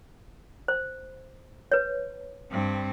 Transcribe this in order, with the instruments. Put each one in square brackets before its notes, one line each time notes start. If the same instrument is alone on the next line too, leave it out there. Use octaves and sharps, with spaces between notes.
[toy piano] C5
B4 C#5
[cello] G2 C4